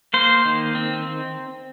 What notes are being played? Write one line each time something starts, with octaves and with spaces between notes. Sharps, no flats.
A#3 C5
D#3
C4